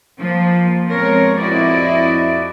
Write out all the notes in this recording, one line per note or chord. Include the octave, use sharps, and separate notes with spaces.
F3 A#3
F2 G#3 B3 C4 A#4 C#5
F2 E4 F#4 D5 D#5